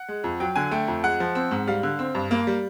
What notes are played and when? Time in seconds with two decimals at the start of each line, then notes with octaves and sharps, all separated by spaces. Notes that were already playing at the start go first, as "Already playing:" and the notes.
Already playing: F#5
0.08 G#3
0.24 F2
0.40 F#3 G5
0.56 D3 G#5
0.71 A3 G5
0.88 F2
1.03 G#3 F#5
1.20 F3
1.35 C4
1.51 G#2
1.67 G3 F5
1.83 D3
1.99 C4
2.15 G2
2.31 A#3
2.47 G3